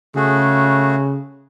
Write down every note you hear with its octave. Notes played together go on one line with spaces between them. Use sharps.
C#3 A3 F#4 G#4